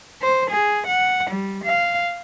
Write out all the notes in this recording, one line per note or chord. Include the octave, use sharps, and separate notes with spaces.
C5
G#4
F#5
G3
F5